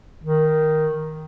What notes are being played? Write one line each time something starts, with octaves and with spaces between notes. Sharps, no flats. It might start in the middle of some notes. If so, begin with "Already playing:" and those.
D#3